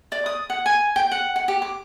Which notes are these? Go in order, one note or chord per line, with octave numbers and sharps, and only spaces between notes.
D5
D#6
F#5
G#5
G5
F#5
F#5
G4
D6